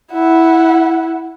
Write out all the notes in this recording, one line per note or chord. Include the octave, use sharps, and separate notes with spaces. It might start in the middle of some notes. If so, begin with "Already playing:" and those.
E4 F#5